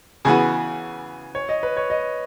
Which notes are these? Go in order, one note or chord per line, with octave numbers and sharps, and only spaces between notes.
C#3 E3 B3 F#4 G#5
C#5
D#5
B4
C#5
D#5